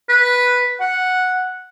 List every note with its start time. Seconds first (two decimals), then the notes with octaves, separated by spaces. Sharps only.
0.09 B4
0.80 F#5